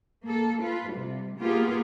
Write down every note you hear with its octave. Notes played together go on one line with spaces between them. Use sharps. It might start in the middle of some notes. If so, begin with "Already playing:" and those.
A#3 A4
F4 B4
C3 G3
A#3 B3 F4 G4 G#4